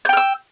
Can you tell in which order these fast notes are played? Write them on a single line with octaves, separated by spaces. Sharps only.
G6 G5 F6 E6